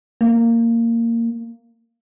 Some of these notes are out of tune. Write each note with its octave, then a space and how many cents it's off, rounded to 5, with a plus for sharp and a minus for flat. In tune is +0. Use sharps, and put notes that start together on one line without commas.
A#3 -15